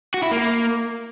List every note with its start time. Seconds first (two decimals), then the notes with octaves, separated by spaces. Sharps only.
0.14 F#4
0.23 E4
0.31 A#3